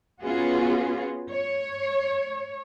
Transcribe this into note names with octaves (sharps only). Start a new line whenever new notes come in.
B3 C#4 F4 F#4 G#4
C#5